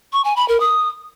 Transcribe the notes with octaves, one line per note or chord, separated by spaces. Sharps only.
C#6
G#5
B5
A#4
D#6